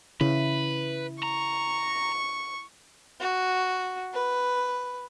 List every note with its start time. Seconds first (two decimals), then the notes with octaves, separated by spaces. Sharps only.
0.21 C#3 E4 B4
1.23 A#5 C#6
3.20 F#4
4.14 B4